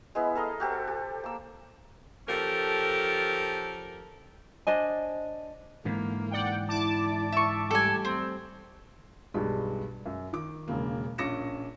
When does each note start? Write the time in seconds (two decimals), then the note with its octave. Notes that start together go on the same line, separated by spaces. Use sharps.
0.15 G#3 B3 E4
0.35 A4 A#4 D#5 F5
0.60 F#4 G4 A4 C5
0.87 G4
1.24 A#3 E6
2.28 F3 C#4 G4 A4 A#4
4.67 D4 C5 D#5 G#5
5.85 G#2 D3 E3 A#3
6.31 D5 F#5 G5
6.69 E4 D5 A5 D6
7.32 E5 C#6
7.71 G3 A3 A4 G#5
8.05 C4
9.34 B1 G2 G3 G#3
10.06 F#2
10.33 D#3 D6
10.68 E1 C#3 A#3
11.18 A#1 C#4 D6 A#6 C#7 E7